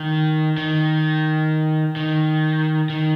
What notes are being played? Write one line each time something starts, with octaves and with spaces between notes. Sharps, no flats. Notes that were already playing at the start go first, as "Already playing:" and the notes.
Already playing: D#3
D#3
D#3
D#3